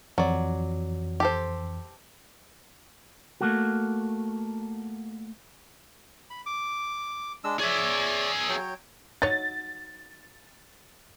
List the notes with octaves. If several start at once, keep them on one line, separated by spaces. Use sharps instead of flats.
F2 E3 F#3 D5
G4 A4 C5
A3 A#3 F#4
B5
D6
G#3 D4 E6
G#4 C#5 D5 E5
F#3 C#5 G5
F#3 D#4 C#5 A6